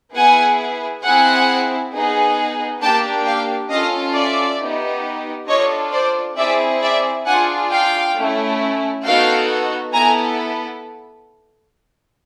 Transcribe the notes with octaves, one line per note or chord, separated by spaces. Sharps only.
B3 E4 G#4 F#5 G#5
C4 E4 G#4 F#5 G#5
B3 D#4 G#4
A#3 D4 G4 G5 A5
F5 G5
C#4 F4 A4 D#5 F5
D5 E5
B3 D#4 G4
D4 F4 A4 C#5 D#5
C5 D5
C4 E4 G#4 D5 E5
D5 E5
D4 F4 G#4 F#5 G#5
F5 G5
A3 C#4 E4
B3 D#4 F#4 A4 F5 G5
B3 E4 A4 G#5 A#5